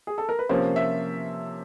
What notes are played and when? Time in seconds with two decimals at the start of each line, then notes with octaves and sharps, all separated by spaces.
0.07 G#4
0.18 A4
0.29 A#4
0.39 B4
0.49 C3 F3 A#3 C#4 C5
0.76 E5